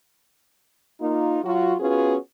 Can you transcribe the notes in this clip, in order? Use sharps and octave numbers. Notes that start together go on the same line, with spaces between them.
A#3 D#4 F4
F#3 F4 F#4
B3 C#4 F4 F#4 G#4 B4